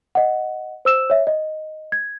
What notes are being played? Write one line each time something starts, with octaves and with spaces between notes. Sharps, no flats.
D#5 F#5
C5 E6 E7
C#5 E5
D#5
G#6